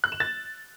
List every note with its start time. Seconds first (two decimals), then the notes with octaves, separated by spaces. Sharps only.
0.04 F#6
0.12 E7
0.20 A6